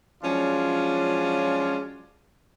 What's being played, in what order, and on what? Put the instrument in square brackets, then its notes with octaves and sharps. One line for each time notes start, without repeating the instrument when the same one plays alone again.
[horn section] F3 F#3 G#3 C#4 D4 F4